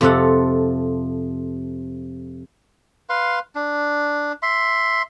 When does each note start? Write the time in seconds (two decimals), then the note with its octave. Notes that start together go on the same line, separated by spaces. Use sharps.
0.01 F2 C3 F4 A4 F#5
3.09 B4 F5 C6
3.55 D4
4.43 E5 C6